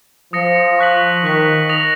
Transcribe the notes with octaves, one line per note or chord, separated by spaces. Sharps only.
F3 D#6 A#6 C#7
C#6 F#6 B6 F#7
D#3 C#6 F#6 B6 F#7
D#6 A#6 F7